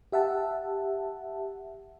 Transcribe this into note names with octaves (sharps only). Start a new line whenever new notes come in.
G4 E5 F#5 A5